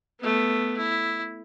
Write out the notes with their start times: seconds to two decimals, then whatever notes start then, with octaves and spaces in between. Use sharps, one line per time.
0.20 A3 B3
0.78 E4